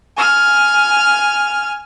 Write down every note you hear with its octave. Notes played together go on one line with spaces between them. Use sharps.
G#5 F6